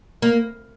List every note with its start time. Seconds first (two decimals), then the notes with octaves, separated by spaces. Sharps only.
0.22 A#3